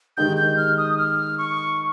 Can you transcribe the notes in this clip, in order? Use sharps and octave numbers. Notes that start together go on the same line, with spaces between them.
D#3 G#3 D#4 G4 G6
G6
F6
D#6
F6
C#6